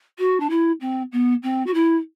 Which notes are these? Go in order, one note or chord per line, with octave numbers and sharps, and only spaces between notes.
F#4
D4
E4
C4
B3
C4
F#4
E4